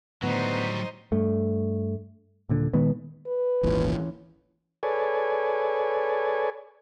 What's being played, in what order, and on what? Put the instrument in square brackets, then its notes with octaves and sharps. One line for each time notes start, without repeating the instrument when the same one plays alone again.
[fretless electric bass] A2 D3 D#3 [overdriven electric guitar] F#3 G3 [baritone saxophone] B3 [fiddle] D#4 C5
[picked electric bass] G2 A3
D#1 A#2 D3
A#2 D#3 G#3 B3
[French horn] B4
[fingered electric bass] D#1 G#1 A#2 [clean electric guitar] E3 C#4
[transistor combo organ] G#4 A4 B4 C#5 D5 G#5